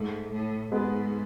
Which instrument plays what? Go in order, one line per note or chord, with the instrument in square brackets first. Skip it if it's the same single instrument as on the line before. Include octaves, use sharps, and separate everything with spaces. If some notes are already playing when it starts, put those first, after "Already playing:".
Already playing: [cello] G#2 [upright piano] A3
[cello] A2
[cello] G#2 [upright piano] G#3 B3